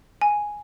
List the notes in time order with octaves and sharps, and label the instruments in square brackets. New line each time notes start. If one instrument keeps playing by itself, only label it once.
[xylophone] G#5